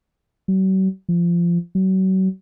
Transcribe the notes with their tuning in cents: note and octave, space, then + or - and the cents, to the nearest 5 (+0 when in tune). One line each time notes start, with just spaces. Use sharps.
F#3 +45
F3 -20
F#3 +35